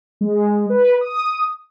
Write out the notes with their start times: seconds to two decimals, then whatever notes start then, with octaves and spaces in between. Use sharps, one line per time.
0.21 G#3
0.70 B4
1.01 D#6